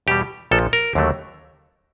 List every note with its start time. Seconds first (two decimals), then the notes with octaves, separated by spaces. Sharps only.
0.07 E2 B2 G3 G4
0.51 A#1 A#2 F3 A4
0.73 A#4
0.95 D#2 D3 F#3 A3